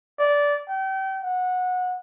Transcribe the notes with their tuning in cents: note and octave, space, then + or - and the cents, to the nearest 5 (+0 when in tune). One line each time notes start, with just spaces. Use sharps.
D5 -15
G5 -35
F#5 -20